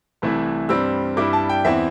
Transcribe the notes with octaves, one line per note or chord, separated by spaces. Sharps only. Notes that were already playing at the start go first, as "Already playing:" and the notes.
C2 C3 E3 A3 E4
G2 G3 C4 E6
G2 G3 E4 D6
A5
G5
E2 E3 C4 E4 E5